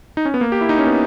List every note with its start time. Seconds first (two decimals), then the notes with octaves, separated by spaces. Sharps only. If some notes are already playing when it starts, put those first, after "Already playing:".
0.17 D#4
0.25 C#4
0.34 B3
0.41 A#3
0.52 G4
0.61 E4
0.69 D#4
0.79 C#4
0.87 B3